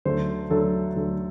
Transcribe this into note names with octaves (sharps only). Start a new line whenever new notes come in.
D2 D3 F#3 A3 C5
D2 D3 F#3 A3 A4
D2 D3 F#3 A3